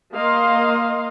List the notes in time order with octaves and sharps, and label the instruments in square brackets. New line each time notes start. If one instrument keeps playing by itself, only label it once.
[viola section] A#3 D#5 F5 C6